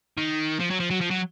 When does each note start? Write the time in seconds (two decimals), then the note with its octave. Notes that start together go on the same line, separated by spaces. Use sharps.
0.17 D#3
0.60 F3
0.70 F#3
0.80 F3
0.90 F#3
1.01 F3
1.11 F#3